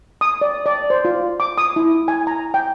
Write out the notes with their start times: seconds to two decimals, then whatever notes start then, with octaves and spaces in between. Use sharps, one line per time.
0.21 D#6
0.41 D5
0.66 D5
0.90 C5
1.05 F4
1.40 D6
1.58 D#6
1.76 E4
2.08 G#5
2.27 A#5
2.54 G5